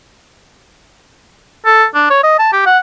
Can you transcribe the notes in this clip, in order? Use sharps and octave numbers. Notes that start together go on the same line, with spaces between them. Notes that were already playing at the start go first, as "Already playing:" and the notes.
A4
D4
C#5
D#5
A5
G4
F#5